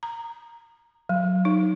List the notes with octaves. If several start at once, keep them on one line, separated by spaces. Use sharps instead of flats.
A#5
F#3
D#4